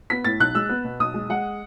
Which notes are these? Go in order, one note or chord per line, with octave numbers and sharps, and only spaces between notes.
B3 B6
A2 A6
B1 F#6
G#3 E6
B3
B2
B1 D#6
G#3
G#3 F#5